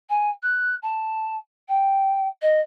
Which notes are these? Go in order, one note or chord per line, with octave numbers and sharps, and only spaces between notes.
G#5
F#6
A5
G5
D#5